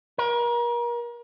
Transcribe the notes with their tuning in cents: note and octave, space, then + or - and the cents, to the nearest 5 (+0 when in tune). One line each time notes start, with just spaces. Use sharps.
A#4 +35